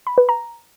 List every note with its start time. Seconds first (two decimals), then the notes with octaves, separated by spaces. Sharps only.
0.07 B5
0.18 B4
0.29 A#5